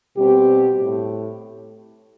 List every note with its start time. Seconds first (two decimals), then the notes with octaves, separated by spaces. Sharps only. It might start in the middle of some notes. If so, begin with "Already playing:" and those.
0.17 B2 G3 C4 G4
0.78 A2